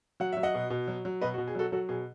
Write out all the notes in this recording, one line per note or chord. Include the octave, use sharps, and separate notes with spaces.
F#3 F#5
F#3 E5
D#5 F#5
B2
B2
F#3
F#3
B2 B4 D#5
F#4
B2
G#4
F#3 F#4 A4
F#3 F#4 A4
B2 G#4